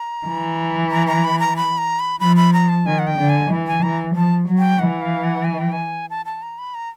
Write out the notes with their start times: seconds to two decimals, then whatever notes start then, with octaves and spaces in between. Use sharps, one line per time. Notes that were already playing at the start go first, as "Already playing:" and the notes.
Already playing: A#5
0.27 E3
0.91 A#5
1.07 A#5
1.24 B5
1.39 A#5
1.57 B5
1.78 A#5
1.99 B5
2.20 F3 B5
2.36 B5
2.53 A#5
2.69 A5
2.86 D#3 G#5
2.99 F#5
3.07 G5
3.18 D3
3.29 G#5
3.50 E3
3.67 G#5
3.82 E3 A#5
4.15 F3 A5
4.47 F#3
4.58 G5
4.79 E3 F#5
5.02 F5
5.24 F#5
5.44 G#5
5.58 G5
5.72 G#5
6.10 A5
6.26 A5
6.42 A#5
6.59 B5
6.75 A#5